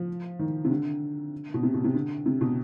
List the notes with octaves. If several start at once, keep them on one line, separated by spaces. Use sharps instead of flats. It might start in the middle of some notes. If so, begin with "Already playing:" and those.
Already playing: F3
D#3
C3
D3
B2
C3
B2
C3
D3
C3
B2